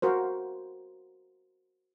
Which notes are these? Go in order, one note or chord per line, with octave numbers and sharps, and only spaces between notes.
F#4 A#4 C5